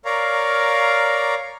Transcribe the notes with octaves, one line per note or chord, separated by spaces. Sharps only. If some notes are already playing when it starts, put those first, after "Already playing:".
A#4 C#5 D5 F5 A#5